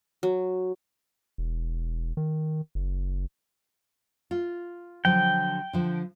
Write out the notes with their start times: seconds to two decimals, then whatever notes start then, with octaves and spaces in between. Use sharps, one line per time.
0.23 F#3
1.38 E1
2.17 D#3
2.75 F#1
4.31 F4
5.05 D3 F3 F#3 G5
5.73 D3 F3